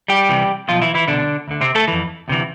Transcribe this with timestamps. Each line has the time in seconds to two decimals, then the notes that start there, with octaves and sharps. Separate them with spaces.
0.08 G3 G4
0.29 C2 C3 E3
0.68 B1 B2 F3 F4
0.82 E3 E4
0.95 E3 E4
1.08 C2 B2 D3 D4
1.48 D2 D3
1.61 C3 C4
1.75 A3 A4
1.88 F2 E3
2.28 D2 C3 E3